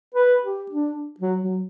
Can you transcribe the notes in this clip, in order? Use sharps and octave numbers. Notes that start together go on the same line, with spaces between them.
B4
G4
D4
F#3
F#3